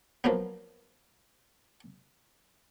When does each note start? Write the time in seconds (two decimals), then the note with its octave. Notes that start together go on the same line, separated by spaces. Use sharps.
0.24 F3 F#3 A#3 B3